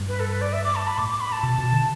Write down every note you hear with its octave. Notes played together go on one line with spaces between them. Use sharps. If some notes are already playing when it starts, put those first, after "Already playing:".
Already playing: G2
B4
A4
B4
D5
E5
D6
A5
B5
A2 D6
D6
B5
A5
B2
B2
D3